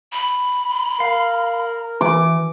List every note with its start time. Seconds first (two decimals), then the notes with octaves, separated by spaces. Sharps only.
0.12 B5
1.00 A#4 F5
2.01 E3 D6